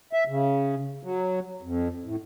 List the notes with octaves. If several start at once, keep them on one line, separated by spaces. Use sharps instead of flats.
E5
C#3
F#3
F2
A2